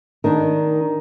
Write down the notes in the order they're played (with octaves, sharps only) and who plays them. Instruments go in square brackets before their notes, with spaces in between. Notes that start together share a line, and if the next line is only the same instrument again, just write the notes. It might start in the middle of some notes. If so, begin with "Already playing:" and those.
[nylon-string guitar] D#3 D4